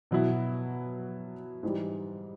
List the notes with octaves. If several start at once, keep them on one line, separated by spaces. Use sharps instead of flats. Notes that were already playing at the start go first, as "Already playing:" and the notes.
B2 F#3 B3 E4
G#2 E3 G3